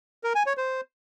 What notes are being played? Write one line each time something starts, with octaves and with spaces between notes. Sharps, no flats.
A#4
G#5
C#5
C5